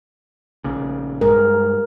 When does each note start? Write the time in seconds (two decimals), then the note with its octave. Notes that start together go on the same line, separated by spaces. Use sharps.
0.64 A#1 A#2 C#3
1.21 G2 G#3 A#4